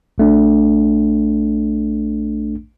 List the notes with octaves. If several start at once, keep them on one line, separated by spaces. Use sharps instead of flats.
A#1 A3 D4